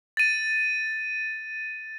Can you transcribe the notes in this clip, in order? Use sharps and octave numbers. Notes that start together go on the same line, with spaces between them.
A6 D#7